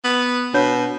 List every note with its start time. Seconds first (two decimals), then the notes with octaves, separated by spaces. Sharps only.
0.04 B3
0.54 B2 D4 C#5 G6